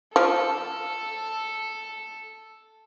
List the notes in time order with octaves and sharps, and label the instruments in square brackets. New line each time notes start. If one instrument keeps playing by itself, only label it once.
[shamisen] F3 [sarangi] A4